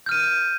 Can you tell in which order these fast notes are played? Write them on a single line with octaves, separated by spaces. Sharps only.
G6 F6 D#7